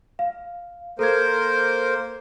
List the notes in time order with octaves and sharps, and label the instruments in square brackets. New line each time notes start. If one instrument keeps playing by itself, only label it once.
[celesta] F5
[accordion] A#3 A#4 C5 [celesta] A4 G#6